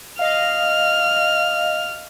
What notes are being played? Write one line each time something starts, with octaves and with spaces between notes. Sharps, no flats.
D#5 F5 F6